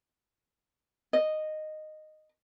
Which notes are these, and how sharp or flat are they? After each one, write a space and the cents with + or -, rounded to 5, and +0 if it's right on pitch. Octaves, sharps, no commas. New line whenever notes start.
D#5 -10